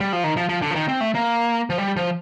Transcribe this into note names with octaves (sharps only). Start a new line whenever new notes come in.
G3
F3
D#3
F3
F3
D3
F3
D#3
C4
A3
A#3
F3
G3
F3